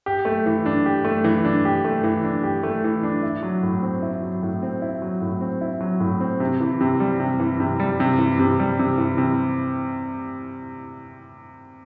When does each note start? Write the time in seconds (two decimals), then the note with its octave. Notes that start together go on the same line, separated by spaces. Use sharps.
0.06 G4
0.25 A3
0.46 E3
0.66 D4
0.86 G4
1.04 A3
1.24 E3
1.44 D4
1.65 G4
1.84 A3
2.04 E3
2.24 D4
2.43 G4
2.63 A3
2.84 E3
3.03 D4
3.23 E4
3.43 F#3
3.63 A2
3.83 C4
4.02 E4
4.22 F#3
4.43 A2
4.62 C4
4.82 E4
5.02 F#3
5.22 A2
5.41 C4
5.61 E4
5.81 F#3
6.00 A2
6.20 C4
6.40 C3
6.60 E3
6.81 C3
7.00 G3
7.20 C3
7.40 E3
7.60 C3
7.80 G3
8.00 C3
8.19 E3
8.40 C3
8.59 G3
8.79 C3
8.98 E3
9.18 C3